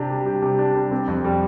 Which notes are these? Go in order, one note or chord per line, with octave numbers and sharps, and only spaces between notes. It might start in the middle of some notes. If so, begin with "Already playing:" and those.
Already playing: C3 D4 G4
G3
G4
C3
D4
G3
C4
F2
G3